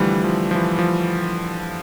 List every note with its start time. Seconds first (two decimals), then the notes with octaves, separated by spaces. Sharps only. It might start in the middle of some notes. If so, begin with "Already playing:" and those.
Already playing: D3 E3 F3 G3 A3
0.24 F3
0.51 F3
0.55 E3
0.79 F3